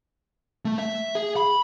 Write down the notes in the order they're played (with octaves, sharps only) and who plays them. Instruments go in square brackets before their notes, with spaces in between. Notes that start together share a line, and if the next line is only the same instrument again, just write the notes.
[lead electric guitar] A3
E5
G#4
B5